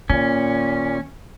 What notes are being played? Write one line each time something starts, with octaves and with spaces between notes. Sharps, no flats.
A#2 D#3 A#3 C#4